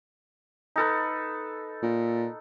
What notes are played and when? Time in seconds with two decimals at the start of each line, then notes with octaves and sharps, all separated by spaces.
0.76 D#4 A4 B4
1.83 A#2